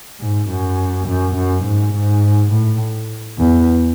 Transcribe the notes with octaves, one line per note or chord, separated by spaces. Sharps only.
G#2
F#2
F#2
F#2
G#2
G#2
A2
E2